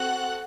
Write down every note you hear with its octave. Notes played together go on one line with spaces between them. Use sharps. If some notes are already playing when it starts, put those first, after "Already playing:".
Already playing: C4 F#4 A4 F#5 F#6